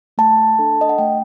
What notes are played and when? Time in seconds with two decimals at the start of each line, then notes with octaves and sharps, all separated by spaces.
0.18 A3 A5
0.59 D4 A4
0.81 D#5
0.89 F#5
0.98 A3 G5